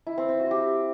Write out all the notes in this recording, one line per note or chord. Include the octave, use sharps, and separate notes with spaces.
E4
C4
C4
F#4
G4